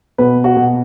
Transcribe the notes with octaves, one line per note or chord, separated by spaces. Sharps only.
B2 B4
F#4
B2